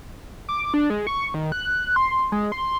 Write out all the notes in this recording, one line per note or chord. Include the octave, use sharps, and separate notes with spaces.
D6
D4
G#3
C#6
D#3
F#6
C6
G#3
C6